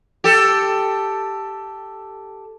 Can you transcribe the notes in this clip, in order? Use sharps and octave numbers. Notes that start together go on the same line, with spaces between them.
G4 A4